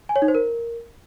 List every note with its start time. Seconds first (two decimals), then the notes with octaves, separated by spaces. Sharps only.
0.09 G#5
0.16 C#5
0.22 D#4
0.28 C5
0.35 A#4